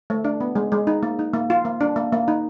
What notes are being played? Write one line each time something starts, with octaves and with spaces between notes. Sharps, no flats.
A3
D4
B3
G#3
G#3
D#4
A#3
D#4
A#3
F4
A#3
D4
A#3
A#3
D#4